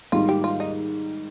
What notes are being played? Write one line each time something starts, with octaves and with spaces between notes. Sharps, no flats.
G#2 D#3 G3 A#3 F4
G4
F4
D#4